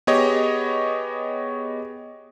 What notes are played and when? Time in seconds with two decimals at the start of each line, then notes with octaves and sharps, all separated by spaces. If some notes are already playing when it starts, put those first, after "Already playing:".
0.07 B3 G4 G#4 C#5 D#5